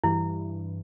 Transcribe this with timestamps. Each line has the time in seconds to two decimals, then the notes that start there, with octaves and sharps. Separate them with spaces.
0.04 G2 E3 E4